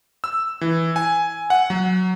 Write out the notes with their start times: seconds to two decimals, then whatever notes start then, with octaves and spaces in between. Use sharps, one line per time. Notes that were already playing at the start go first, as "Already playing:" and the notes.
0.24 E6
0.61 E3
0.96 G#5
1.50 F#5
1.70 F#3